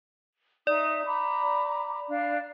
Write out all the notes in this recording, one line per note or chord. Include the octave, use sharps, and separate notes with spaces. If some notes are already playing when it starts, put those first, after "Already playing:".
D#4 D5 E5 D#6
A#5 B5 D6
D4 F5